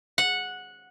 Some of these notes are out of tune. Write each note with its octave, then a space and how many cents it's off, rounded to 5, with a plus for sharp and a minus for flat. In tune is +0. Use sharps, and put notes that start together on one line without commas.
F#5 -10